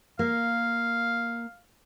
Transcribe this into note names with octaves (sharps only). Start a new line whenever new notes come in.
A#3 F5